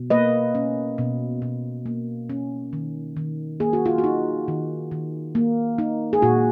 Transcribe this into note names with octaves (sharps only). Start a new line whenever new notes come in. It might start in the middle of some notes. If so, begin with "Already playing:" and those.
Already playing: B2
A#3 B4 D#5
C#4
B2
B2
A#3
C#4
D#3
D#3
A#3 G#4
F#4
F4
F#4
D#4
D#3
D#3
A#3
D#4
G#4
A#2 F#4